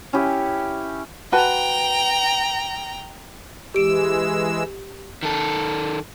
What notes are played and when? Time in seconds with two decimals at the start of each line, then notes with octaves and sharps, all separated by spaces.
0.13 C#4 E4 G4
1.32 F#4 B4 G5 A5 A#5
3.74 E3 G#3 G4 E6 D7
5.23 D#3 A4